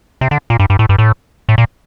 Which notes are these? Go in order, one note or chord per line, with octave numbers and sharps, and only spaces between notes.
C3
D3
A#2
G2
G2
A2
G2
A2
A2
A#2